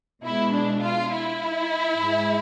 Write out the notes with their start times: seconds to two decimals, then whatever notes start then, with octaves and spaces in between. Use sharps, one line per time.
0.24 B2 G#3 E4
0.53 D4
0.82 F4
1.12 E4
1.99 G#2 G#3